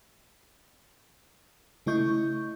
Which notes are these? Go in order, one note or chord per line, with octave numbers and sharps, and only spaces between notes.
C#3 A3 E4 D#5 C#6 G6